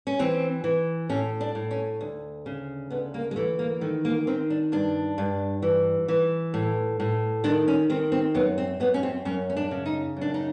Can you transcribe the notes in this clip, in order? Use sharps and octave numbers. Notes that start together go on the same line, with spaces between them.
C#4
E3 C4
E3
A2 C#4
D4
A2
C#4
D2
C#3
D2 B3
A#3
G#3
E3 A3
A#3
D#3 A3
A#3
D#3 C4
D4
G2 D4
G2
E3
E3
A2
A2
D#3 D4
C#4
D#3 C4
C4
F#2 B3
C4
F#2 B3
C#4
C4
F#2 C#4
C#4
D4
C#3
D#4
F#2 D4
D#4